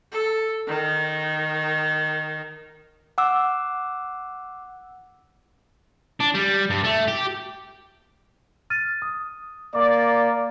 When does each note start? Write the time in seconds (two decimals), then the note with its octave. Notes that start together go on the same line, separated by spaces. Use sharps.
0.12 A4
0.68 D#3
3.18 F#5 D6 E6
6.20 D4
6.34 G3
6.70 G2
6.84 A3
7.08 G4
8.70 F6 A6 D#7
9.02 D#6
9.75 A#3 D5 D6 A6